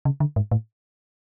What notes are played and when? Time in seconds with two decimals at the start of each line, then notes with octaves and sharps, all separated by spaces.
0.05 C#3
0.20 D3
0.36 G#2
0.51 A2